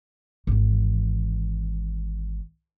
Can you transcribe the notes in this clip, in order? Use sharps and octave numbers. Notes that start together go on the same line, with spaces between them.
G#1 E3